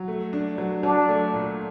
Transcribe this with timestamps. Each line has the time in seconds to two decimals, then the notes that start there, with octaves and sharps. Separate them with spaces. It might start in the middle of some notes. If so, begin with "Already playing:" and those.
Already playing: F#3
0.08 A3
0.33 D4
0.58 F#3
0.83 F#3 D4
1.09 A3
1.33 A#2